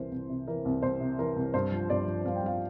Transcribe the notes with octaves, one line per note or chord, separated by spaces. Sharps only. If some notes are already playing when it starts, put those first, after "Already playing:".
Already playing: C2 C3 E3 A#4 C5
C2
C3
E3 A#4
C2
C2 C5
C3
E3 A#4
C2
G2 C5
F3
G2 D5
F3
G2 F5
G5
F3 F5